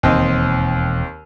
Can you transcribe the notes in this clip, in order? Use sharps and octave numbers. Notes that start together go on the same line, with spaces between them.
E1 D#2 C4 D#4